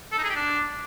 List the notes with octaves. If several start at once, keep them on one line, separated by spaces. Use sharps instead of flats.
A4
D#4
G#4
G4
D4